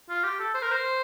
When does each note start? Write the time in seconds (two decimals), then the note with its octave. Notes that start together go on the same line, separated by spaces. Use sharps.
0.09 F4
0.24 G4
0.39 A4
0.55 C5
0.62 A#4
0.72 C5